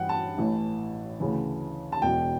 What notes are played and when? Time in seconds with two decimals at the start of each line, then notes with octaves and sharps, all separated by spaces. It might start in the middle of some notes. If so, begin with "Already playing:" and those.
Already playing: G2 E3 F#5 G5
0.09 A5
0.38 A1 A2 E3
1.20 D2 C#3 E3
1.92 A5
2.02 E1 E2 B2 G5